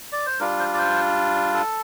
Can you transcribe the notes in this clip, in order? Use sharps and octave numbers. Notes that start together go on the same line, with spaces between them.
D5
C5
G3 D4 F4 A#4
C5
D5
C5
A4